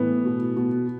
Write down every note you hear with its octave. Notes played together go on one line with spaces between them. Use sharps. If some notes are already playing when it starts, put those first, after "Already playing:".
Already playing: A2 E3 B3
B2
B2